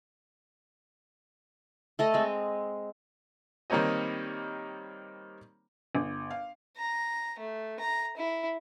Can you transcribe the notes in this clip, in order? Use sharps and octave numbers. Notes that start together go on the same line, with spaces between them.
A3 A4 D#5
G#3 C4
D#3 G3 A#3 C4 C#5 D#5
G1
F5
A#5
A3
A#5
E4